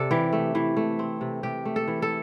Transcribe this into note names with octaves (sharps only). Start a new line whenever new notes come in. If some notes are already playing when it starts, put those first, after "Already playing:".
Already playing: C3 A4 D5
E3 G4
A3
E3
A3
C4
C3
C3 G4
A3
A4
E3
A4